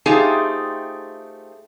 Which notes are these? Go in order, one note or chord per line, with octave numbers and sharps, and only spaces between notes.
A3 C4 D#4 F4 G4 G#4